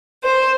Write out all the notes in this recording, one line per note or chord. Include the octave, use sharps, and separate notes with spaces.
C5